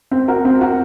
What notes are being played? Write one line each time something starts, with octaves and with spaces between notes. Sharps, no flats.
C4
F#4 A#4
C4
F#4 A#4